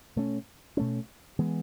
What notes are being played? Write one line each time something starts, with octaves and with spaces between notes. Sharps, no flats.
B2 A3 C#4
B2 A3 C#4
E3 G#3 B3